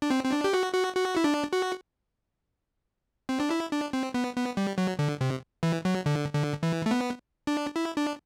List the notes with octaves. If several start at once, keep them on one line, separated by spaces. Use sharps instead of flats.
D4
C4
C4
D4
G4
F#4
F#4
F#4
E4
D4
F#4
C4
D4
E4
D4
C4
B3
B3
G3
F#3
D3
C3
E3
F#3
D3
D3
E3
A3
B3
D4
E4
D4